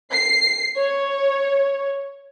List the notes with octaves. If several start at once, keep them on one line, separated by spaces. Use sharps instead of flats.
C7
C#5